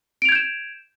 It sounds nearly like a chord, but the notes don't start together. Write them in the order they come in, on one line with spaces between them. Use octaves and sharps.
D7 F7 G#6 G6 E7